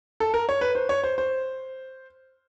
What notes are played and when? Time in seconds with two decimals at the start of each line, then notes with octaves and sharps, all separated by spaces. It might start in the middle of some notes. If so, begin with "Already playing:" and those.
0.20 A4
0.34 A#4
0.49 C#5
0.61 B4
0.75 C5
0.89 C#5
1.04 C5
1.18 C5